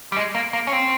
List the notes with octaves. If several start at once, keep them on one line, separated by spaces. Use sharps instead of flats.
G3
G#3
A#3
A#3
C#4
C4